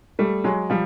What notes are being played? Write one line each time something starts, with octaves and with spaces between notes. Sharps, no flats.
G3 A3
F#3 G#3
F3 G3